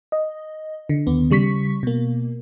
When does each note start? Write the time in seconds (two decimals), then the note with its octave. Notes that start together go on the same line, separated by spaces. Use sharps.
0.12 D#5
0.89 D3
1.07 D#2 B3
1.31 C#3 G3 C#6 B6
1.83 B2 A#3